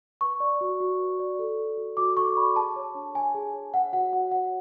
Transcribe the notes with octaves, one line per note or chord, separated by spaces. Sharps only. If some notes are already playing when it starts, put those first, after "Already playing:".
B4 C#6
D5
F#4
F#4
B4
D5
A4
D5
F#4
F#4 D6
A4 C#6
D5 B5
G#4 A5
C#5
D4
D4 G#5
G#4
C#5
C#5 F#5
F#4 F#5
F#4 F#5
C#5 F#5